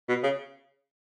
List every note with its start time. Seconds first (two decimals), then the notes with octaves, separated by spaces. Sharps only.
0.09 B2
0.23 C#3